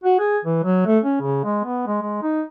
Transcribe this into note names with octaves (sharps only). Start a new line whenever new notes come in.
F#4
G#4
E3
F#3
A3
C#4
C#3
G#3
B3
G#3
G#3
D#4